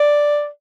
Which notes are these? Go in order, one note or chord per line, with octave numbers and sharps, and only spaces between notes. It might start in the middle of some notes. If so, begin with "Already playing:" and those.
Already playing: D5